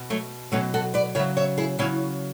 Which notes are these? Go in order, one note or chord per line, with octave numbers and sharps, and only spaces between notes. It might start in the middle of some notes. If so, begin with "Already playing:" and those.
Already playing: B2
F#3 A3
B2 F#3 A3 C#4
F#4 A4
B4 D5
C#3 F#3 C#5 E5
C#5 E5
E4 G#4
C#3 F#3 C#4 E4